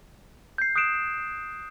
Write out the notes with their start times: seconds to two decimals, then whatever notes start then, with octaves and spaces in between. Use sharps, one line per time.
0.58 G6 C7
0.76 D#6 F#6 C7 D7 E7